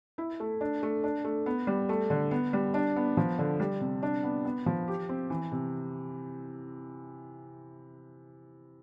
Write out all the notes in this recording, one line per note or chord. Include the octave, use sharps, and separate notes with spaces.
E4
A3
D4
A3
D4
A3
B3
G3
A3
D3
B3
G3
D4
B3
F3
D3
G3
C3
D4
B3
B3
F3
G4
C4
E3
C3